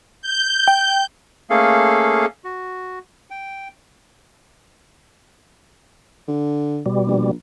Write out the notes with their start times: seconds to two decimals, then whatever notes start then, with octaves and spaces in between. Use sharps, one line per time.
0.22 G6
0.68 G5
1.50 A3 A#3 C#4 G#4 A4 F5
2.44 F#4
3.30 G5
6.28 D3
6.86 B2 G3
7.07 A#1